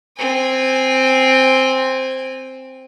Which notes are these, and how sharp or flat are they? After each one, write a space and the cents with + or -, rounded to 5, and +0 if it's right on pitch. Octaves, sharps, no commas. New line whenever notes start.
C4 +0 G#5 -20